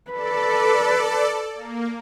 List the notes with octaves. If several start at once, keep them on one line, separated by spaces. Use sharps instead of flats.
A4 B4 D5
A#3